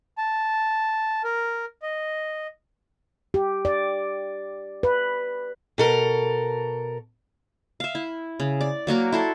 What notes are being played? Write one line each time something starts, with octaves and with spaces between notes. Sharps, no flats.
A5
A#4
D#5
G4
D5
B4
B2 A4 A#4
E5 F5
E4
C#3
D5
F#3 A#3 F#4 A#4
E4 A4 C6